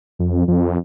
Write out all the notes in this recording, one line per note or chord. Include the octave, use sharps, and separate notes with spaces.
F2
F2